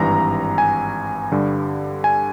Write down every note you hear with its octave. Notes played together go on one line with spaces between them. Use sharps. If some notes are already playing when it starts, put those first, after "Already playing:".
Already playing: G#1 G2 E3 A#5
G#5
G2 D3 G3
G#5